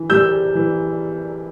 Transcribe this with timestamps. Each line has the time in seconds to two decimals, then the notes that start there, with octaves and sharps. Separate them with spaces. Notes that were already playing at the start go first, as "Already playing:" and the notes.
Already playing: E3
0.10 G3 E6 G6
0.55 E3